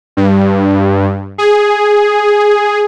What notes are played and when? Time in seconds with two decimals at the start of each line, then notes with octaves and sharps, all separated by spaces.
0.17 G2
1.38 G#4